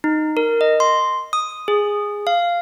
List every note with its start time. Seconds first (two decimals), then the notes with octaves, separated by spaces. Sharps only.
0.04 D#4
0.37 A#4
0.61 D#5
0.80 C6
1.33 D#6
1.68 G#4
2.27 F5